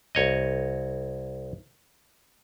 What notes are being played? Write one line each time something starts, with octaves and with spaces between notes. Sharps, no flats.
C2 C#5 D#5